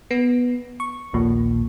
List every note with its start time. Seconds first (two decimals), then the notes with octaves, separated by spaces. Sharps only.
0.11 B3
0.80 C#6
1.13 A#1 D#2 A#2